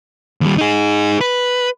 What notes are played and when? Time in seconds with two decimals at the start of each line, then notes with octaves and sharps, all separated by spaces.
0.41 D#2 G3
0.58 D#4 G#4
1.21 B4